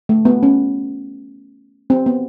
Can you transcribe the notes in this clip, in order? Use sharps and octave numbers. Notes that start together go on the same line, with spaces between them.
A3
B3
C#4
C4
B3